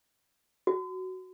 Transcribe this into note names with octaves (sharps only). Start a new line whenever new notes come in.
F#4